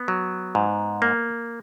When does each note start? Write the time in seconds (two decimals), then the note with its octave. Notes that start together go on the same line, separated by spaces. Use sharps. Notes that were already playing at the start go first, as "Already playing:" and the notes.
Already playing: B3
0.08 F#3
0.55 G#2
1.02 A#3